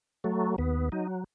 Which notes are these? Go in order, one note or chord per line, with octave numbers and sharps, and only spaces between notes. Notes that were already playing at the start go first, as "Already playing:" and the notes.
F#3 A3
D#2 B3
F#3 D#4